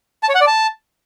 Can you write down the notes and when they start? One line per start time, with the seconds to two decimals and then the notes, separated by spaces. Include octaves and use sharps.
0.23 A5
0.29 C#5
0.35 F#5
0.41 D5
0.47 A5